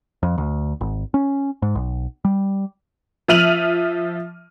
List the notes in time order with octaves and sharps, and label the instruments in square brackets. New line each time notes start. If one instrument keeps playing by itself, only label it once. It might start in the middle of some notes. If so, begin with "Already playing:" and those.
[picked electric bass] F2
D2
G#1
C#4
G#2
B1
G3
[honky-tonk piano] F3 E5 F6 D#7 F7 F#7